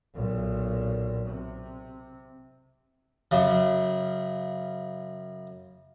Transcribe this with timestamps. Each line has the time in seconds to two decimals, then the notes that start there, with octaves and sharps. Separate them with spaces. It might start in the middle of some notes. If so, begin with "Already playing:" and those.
0.14 B1 A#2
1.28 C3
3.31 F#2 C#3